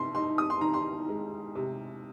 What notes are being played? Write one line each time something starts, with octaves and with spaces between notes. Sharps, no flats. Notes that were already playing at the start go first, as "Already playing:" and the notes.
Already playing: C3 C6
D#4 C6
D#6
C6
D#3 A#5
C6
G#3
C3